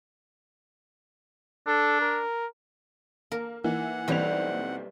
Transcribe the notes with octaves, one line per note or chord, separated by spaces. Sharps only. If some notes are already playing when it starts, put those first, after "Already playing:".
D4 A4
A#4
A#3 A#4
E3 A#3 D#4 E4 F#5
B1 E3 G3 C4 F7